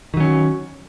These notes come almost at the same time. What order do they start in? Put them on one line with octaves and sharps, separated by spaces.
D#3 F#3 C#4